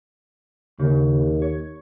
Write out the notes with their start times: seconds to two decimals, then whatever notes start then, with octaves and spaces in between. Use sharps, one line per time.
0.79 D#2 C#3
1.42 C#5